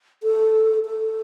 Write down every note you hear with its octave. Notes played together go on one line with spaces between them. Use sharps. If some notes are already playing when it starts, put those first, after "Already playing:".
A4
A4